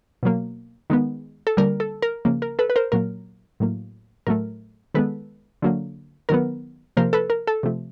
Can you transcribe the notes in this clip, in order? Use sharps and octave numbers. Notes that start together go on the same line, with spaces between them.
B2 F#3 A#3
D#3 G#3 B3
A4
D3 G3 A#3 A#4
A4
A#4
C#3 F3 A#3
A#4
A4 B4
B4
A#4 C5
A#2 F#3 A#3 A#4
A2 F#3 A#3
A2 F#3 A3 A#4
D#3 G#3 B3 A4 B4
D3 F#3 A#3
D#3 F#3 B3 A#4
C3 F3 A#3 A#4 C5
A4 B4
A#4
A4
C3 F3 A3